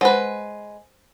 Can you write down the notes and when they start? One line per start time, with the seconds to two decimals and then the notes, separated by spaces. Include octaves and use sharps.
0.01 G#3 B4 C5 F#5